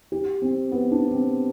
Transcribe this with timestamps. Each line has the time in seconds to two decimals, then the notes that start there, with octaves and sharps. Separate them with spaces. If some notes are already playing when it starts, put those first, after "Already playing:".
0.12 G4
0.42 C4
0.72 B3
0.91 D4
1.11 C4